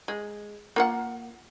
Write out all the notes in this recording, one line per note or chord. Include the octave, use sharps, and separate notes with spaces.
G#3
A#3 F4 F#5